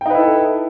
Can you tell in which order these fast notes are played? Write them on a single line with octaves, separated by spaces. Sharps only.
G5 D#4 B4 E4 A4